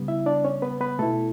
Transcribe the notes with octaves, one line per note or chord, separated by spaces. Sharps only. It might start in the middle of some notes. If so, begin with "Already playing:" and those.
Already playing: C#3 G3 B3
E4 E5
D4 D5
C#4 C#5
B3 B4
B3 B4
B2 A3 E4 A4